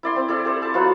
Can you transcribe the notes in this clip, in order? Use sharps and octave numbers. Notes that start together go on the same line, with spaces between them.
E4 D5 C6
C4
E4 A4 D5
G4 A4 C5
A4 A5
F#3 B3 D#4 F4